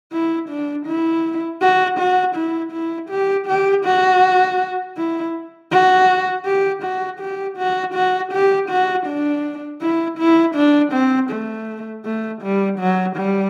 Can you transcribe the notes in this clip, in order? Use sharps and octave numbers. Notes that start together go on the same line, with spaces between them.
E4
D4
E4
F#4
F#4
E4
E4
G4
G4
F#4
E4
F#4
G4
F#4
G4
F#4
F#4
G4
F#4
D4
E4
E4
D4
C4
A3
A3
G3
F#3
G3